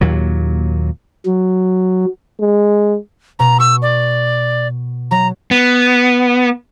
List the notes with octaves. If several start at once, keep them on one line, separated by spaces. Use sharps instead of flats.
D#2 A#2 F#3
F#3
G#3
B2 A#5
C#6 E6
D5
F#3 A#5
B3